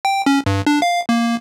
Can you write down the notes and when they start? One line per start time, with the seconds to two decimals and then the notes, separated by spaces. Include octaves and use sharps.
0.05 G5
0.26 C#4
0.46 G2
0.67 D4
0.82 F5
1.09 A#3